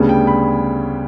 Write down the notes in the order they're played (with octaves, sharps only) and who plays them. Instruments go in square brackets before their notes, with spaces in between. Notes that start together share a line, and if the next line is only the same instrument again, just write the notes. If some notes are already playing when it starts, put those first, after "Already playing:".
Already playing: [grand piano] D2 C#3 G3 B3 D4
G5
B5